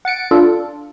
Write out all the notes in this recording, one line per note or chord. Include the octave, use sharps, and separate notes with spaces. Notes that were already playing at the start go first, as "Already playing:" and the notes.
F#5 A6 C#7 D7
D4 F4 A4